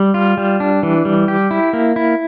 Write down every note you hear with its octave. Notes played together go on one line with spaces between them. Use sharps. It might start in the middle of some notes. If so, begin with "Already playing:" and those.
Already playing: G3
F4
G3
D4
E3
G3
G4
E4
A#3
E4